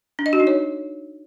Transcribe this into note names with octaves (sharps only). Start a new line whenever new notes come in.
D4
D#5
F#4
D#4
C#5